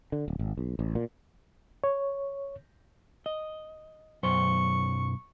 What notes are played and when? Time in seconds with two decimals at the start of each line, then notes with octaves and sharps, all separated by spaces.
0.12 D3
0.28 D1
0.39 G#1
0.58 B1
0.79 A1
0.95 A#2
1.84 C#5
3.26 D#5
4.23 B1 F#2 C5 C#6